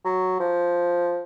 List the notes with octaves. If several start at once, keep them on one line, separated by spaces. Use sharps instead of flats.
F#3
F3